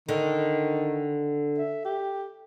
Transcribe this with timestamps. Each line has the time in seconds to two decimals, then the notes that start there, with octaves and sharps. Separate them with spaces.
0.09 D3 D#3
1.58 E5
1.85 G4